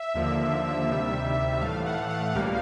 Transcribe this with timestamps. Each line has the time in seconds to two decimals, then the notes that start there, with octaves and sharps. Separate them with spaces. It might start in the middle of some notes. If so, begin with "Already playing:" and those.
Already playing: E5
0.14 D#2 D3 F3 A#3
0.87 D2 C3 D#3 G3
1.61 A2 E3 A3 F5
1.86 F#5
2.10 F#5
2.25 F#5
2.34 C#2 B2 G3 A#3 F5